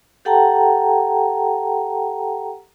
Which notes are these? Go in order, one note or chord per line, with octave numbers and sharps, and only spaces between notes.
G4 A4 F#5 G5 A5 A#5